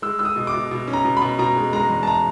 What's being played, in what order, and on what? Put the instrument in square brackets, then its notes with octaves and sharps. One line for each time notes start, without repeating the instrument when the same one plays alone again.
[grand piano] G#3 E6
G#3 E6
D#6
B2
D6
B2
B2
C#4
A#5
B2
B5
B2
B2 A#5
G#3
G#3 A#5
E2
A5
A#5